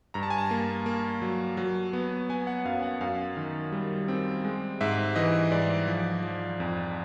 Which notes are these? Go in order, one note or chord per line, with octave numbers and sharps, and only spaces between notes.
G2 A#5
A5
G#5
A5
A#3
A#3
F#3
F#3
B3
B3 G#5
F#5
F#2 F5
F#5
F#2 F5
D#3
G3
C4
G#3
G#2 E5
E3 D#5
G#2 D5
F3
F3
F2